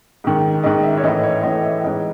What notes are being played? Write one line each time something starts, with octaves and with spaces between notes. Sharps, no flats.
G#2 D#3
G#2 D#3 D#5
E5
C#5
A2 E3 D#5
C#5
A2 E3 D#5
E5
G#2 E3 D#5